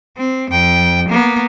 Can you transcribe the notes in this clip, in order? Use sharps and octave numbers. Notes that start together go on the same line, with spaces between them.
C4
F2 G5
A#3 B3